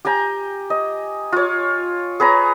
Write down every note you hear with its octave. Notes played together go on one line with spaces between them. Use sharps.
G4 G5 G#5 A#5
D#5
F4 C#5
G#4 B4 C#5 A#5